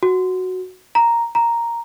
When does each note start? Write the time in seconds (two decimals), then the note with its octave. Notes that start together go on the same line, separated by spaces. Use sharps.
0.03 F#4
0.95 A#5
1.35 A#5